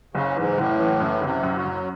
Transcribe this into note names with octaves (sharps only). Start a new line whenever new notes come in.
F#1 C#3
G#2 E3
F#1 A2
E3
F#2
F#1 C3
F#2
F#3
F#2